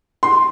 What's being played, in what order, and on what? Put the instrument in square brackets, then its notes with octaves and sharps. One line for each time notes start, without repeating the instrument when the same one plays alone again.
[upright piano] C6